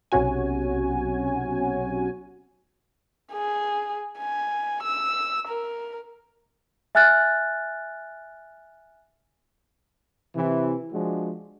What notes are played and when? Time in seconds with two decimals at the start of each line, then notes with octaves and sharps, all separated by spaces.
0.12 B1 C3 C#4 F#4 G#5
3.33 G#4
4.19 G#5
4.84 E6
5.48 A#4
6.95 E5 G#5 F6 F#6 A6
10.35 C3 E3
10.92 F3 G#3 D4 F#4